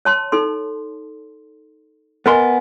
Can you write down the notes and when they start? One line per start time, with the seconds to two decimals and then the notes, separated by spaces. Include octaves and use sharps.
0.05 C#5 A5 C6
0.32 D#4 A4 C6
2.26 B3 A#4 C5 D#5 G#5 C6